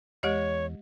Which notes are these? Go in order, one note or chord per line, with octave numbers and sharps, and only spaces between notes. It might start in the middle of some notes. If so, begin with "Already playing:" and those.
E2 G#3 G4 C#5 D#5